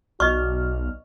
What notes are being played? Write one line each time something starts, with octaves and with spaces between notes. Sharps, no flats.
B1 F#4 D5 D#5 C#6 F6